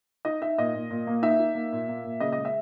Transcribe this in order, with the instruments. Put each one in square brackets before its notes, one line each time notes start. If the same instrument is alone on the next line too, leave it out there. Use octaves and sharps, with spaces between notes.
[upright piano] D#4 D#5
D#4 E5
A#2 D#5
A#2
A#2
A#3
D#4 E5
D#4
A#3
A#2
A#3
A#2
C#3 D#5
G#3 D#5
E5